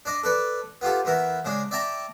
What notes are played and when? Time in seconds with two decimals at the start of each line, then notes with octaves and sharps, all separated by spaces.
0.05 D4 D5 D#5
0.23 A4 B4 D5
0.81 B3 F4 G4 A4
1.05 E2 B3 E4 A#4
1.45 C#3 G#3 D4
1.71 D5 E5 G5 A5 A#5